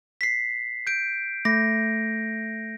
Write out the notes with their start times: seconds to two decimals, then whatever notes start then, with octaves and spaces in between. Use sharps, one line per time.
0.21 B6 C7
0.87 G6 D7
1.45 A3 A#6